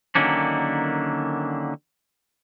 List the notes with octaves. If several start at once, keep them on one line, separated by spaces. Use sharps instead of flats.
D3 D#3 F#3 A#3 C#4 D4